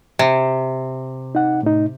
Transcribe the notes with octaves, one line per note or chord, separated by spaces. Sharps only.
C3
D#4 F#5
A2 D#4